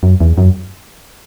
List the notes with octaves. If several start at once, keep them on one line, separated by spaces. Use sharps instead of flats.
F#2
E2
F#2